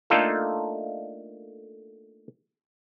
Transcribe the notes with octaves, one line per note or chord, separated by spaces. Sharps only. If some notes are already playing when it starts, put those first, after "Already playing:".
A3 A#3 D4 D#4 F4 A4